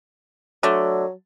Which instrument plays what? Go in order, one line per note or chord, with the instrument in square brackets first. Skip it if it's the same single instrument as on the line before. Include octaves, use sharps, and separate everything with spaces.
[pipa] D3 A3 [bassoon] F#3